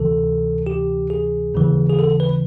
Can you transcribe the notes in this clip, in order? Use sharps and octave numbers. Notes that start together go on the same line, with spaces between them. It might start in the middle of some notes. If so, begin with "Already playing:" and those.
Already playing: D2 C3 E3 A4
G4
G#4
D#2 C#3 E3
G#4
A4
B4